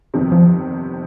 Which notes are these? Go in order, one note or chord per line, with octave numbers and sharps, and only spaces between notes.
G1 F2 C3 D#3
F3